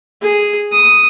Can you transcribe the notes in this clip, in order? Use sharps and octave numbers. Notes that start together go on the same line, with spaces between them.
G#4
D#6